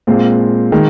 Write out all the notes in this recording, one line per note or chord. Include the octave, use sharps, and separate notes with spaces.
A#2 G#3 C4 F4
D#3 G#3